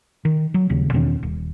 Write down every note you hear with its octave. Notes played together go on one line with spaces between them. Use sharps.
D#3
F#3
D#1 D#2 C#3
E2 B2 D#3 C#4
D#1